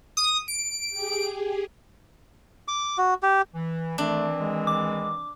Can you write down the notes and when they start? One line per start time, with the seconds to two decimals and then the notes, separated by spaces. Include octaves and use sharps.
0.17 D#6
0.48 D7
0.90 G4 G#4
2.68 D6
2.98 F#4
3.23 G4
3.55 E3
3.98 D#3 E3 A3 C4 D4
4.39 G#3
4.67 D6